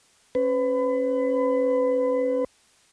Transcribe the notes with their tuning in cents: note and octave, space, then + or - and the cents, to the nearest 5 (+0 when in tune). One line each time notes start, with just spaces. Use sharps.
C#4 -25 B4 +30